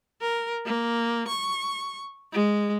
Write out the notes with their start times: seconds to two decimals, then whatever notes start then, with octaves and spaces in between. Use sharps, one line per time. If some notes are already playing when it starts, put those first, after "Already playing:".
0.22 A#4
0.66 A#3
1.28 C#6
2.33 G#3